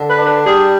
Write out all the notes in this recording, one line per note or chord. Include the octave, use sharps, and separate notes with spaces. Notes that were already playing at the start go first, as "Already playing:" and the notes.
Already playing: D3
B4
D4
B4
G3 G#4